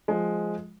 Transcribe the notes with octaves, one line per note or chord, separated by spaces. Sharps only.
F3 G#3